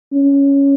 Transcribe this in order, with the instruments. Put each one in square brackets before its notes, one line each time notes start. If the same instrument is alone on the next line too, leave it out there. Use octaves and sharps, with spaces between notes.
[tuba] C#4